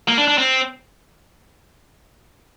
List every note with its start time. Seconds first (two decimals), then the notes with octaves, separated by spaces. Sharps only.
0.08 A#3
0.18 D4
0.28 D4
0.38 C4